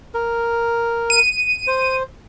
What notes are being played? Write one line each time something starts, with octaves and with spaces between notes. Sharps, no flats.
A#4
D#7
C5